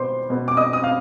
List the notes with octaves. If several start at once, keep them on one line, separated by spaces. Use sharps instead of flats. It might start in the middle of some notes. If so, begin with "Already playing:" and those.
Already playing: B2 B3 C5 C6 D6
B2 B3
D6
D#5 D#6
D#6
F5 F6